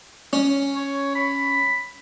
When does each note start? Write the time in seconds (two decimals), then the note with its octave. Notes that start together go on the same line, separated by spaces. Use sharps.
0.33 C#4
0.76 C#5
1.15 B5